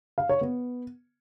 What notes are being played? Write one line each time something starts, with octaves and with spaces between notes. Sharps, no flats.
F5
C#5
B3